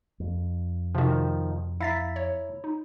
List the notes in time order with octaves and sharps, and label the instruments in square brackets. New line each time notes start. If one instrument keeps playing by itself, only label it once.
[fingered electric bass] F2
[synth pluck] C3 F#4 [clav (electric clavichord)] D#3 F3
[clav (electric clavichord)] E4 A#5 [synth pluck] F5 A6 B6
[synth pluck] C#5
D#4